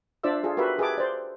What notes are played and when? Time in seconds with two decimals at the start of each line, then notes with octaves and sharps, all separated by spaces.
0.23 D4 F4 C5 D5 E5 E6
0.43 F4 G#4 A4
0.57 F#4 G4 A#4 B4 E5
0.78 G4 G#4 B4 E5 A5 D6
0.98 C5 D5